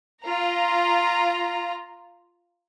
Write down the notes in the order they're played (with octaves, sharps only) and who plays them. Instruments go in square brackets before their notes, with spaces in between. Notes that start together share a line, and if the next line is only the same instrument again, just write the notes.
[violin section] F4 A#5